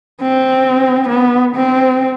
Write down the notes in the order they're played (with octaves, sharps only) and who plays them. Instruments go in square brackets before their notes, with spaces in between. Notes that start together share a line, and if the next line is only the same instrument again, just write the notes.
[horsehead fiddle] C4
B3
C4